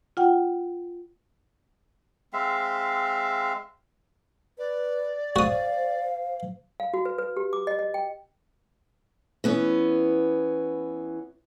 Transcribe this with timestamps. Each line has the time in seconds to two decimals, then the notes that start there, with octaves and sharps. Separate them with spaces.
0.17 F4 F#5 G5
2.33 G#3 C4 E5 F5
4.58 B4 D5
5.36 F#4 C5 F5 D#6
6.80 F5
6.94 F#4
7.05 B4
7.18 B4
7.37 G4
7.53 D6
7.67 D#5
7.79 D#5
7.94 G5
9.44 E3 B3 C#4